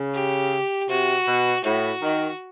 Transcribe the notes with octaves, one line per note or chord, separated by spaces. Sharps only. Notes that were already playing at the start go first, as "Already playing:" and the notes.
Already playing: C#3
G4
C3 F#4
B2
A2 F#4
D#3